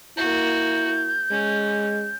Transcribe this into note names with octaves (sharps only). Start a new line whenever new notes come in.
A#3 E4 F#4 G6
G#3 C#4